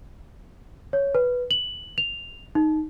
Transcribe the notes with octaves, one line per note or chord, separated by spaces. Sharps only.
C#5
B4
F#7
F7
D#4